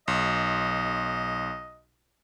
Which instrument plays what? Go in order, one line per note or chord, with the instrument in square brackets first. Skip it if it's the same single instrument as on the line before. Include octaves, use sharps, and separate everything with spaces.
[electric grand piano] B1 [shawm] D#5